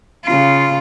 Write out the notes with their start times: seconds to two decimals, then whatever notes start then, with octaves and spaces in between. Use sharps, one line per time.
0.25 C#3 F4